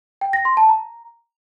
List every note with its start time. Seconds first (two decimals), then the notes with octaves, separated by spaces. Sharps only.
0.21 G5
0.33 A#6
0.45 C6
0.57 A5
0.69 A#5